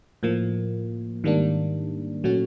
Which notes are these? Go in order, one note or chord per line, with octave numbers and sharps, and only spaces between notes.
A2 F3 A#3
G#2 D#3 G3 A#3 D4
A#2 F#3 A3 C#4 F#4